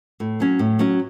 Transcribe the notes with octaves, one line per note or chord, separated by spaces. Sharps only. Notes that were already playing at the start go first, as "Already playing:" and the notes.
A2
F#3 C#4
A2
F#3 C#4